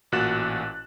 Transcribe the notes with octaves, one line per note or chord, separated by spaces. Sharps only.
A1 A#2 F#4 F#6 A6 E7